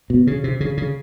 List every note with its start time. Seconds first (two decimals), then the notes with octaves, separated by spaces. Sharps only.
0.10 B2
0.27 C#3
0.44 C3
0.60 C#3
0.77 C#3